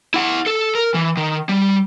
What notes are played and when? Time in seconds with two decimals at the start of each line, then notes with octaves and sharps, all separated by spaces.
0.14 E4 F#5
0.46 A4
0.75 A#4
0.94 E3
1.17 D#3
1.49 G3